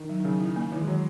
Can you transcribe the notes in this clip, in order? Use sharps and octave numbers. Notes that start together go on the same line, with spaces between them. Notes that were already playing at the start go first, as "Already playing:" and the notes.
Already playing: D#3
F#3
D#3
C#3 F#3
E4
A#3
D#3 E3
G#3
D#3 F#3